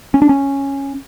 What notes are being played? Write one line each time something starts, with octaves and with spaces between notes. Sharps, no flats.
C#4
D4
C#4